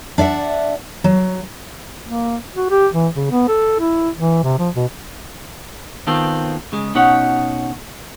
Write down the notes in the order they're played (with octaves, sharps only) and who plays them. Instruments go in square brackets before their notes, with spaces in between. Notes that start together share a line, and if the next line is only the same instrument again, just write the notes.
[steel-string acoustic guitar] D4 D5 E5 F#5
F#3
[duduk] A#3
F#4
G4
E3
C#3
B3
A4
E4
E3
C3
F3
B2
[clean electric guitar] D#3 B3 C4 F4 A4
C#3 G#3
B2 C#4 D#4 C#5 F#5